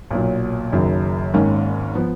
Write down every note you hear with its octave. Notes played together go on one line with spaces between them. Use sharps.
B1 A#2 F#3
F#1 F#2 D#3 F#3
G#1 G#2 D#3 A#3 C#4
F3 B3